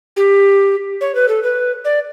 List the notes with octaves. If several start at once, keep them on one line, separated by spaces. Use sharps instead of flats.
G4
C#5
B4
A4
B4
D5